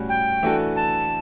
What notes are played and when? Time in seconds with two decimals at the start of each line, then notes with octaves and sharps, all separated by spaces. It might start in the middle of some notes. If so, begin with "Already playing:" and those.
Already playing: A2 G3 C#4 F#4
0.09 G5
0.43 E3 A3 D4 F#4 A4
0.76 A5